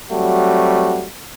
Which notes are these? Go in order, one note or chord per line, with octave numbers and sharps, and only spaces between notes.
F#3 G3 A3 C4 F#4